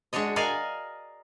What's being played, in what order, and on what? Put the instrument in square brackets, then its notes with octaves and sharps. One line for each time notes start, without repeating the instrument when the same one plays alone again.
[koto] G#3 D4 F#4 C#5 D#5
A#4 D5 D#5 F5 G#5